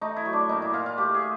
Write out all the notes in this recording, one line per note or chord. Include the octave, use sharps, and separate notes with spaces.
A3 D#4
E4
F#3
D4
A#2 D#4
E4
A#2 F4
F4
A3 G4
G#4